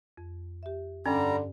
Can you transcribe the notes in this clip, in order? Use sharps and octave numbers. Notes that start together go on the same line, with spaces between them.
F2
G4 E5
G2 D3 G3 C#4 D5 A#5